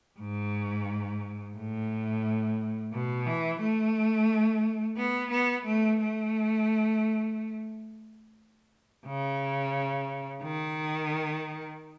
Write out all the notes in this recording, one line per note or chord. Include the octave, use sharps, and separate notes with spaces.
G#2
A2
B2
E3
A3
B3
B3
A3
A3
C#3
D#3